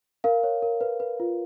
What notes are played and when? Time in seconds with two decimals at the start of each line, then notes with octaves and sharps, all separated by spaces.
0.24 A#4 F5
0.44 C#5
0.62 A#4
0.81 B4
1.00 B4
1.20 F4